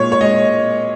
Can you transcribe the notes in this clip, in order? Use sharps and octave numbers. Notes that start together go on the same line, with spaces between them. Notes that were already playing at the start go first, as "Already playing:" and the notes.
Already playing: A#2 G#3 C#5
C#5
G#3 D#5